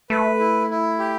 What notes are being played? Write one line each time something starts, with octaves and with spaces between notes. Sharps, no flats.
A3 B4
E4
E4
G4